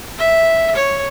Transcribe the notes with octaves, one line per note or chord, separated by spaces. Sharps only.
E5
C#5